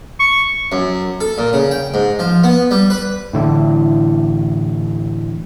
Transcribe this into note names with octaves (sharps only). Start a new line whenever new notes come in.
C#6
F#2
A4
A#2
C#3
G5
G#2
F3
B3
G3
B4
A2 D3 E3